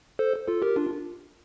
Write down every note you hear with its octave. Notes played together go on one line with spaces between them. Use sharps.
A4 C5
F4 A4
G4 A#4
D4 F4